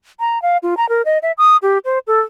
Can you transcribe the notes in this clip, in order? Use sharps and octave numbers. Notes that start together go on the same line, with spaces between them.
A#5
F5
F4
A#5
A#4
D#5
E5
D#6
G4
C5
A4